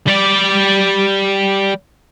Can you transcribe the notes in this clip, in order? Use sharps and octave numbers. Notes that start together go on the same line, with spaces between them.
G3 D5